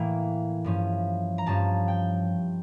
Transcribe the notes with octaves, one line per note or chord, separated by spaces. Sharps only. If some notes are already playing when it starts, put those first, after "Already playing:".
Already playing: A2 E3 A#3
G2 F3 C#4
A#5
G2 F3 C#4 A5
G5